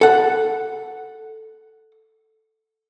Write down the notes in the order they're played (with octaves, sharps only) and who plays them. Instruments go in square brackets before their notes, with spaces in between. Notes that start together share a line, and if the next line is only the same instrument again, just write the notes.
[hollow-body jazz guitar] A4 F#5